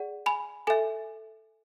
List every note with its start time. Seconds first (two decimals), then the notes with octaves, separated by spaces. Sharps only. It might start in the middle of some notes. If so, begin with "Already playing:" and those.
Already playing: G#4 D5 F#5
0.26 G#5 B5
0.67 A4 E5 G#5